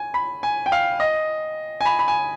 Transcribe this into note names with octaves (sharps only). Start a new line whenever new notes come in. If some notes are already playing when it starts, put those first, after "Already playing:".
Already playing: G#5
B5
G#5
G5
F5
D#5
G#5
B5
B5
G#5